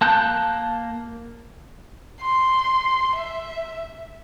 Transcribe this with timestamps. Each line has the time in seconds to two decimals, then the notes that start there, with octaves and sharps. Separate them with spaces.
0.01 A#3 A5 F#6 G6
2.21 C6
3.16 E5